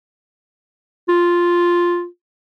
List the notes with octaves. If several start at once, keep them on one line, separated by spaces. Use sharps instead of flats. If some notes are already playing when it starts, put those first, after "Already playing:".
F4